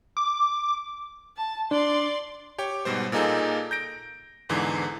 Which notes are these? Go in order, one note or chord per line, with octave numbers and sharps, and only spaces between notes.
D6
A5
D4 D5 C6
G4 C#5 G5
G#2 B2 G3 C5
A#2 A#3 D#4 G#4 A4
G6 A#6 D7
E2 G#2 D3 E3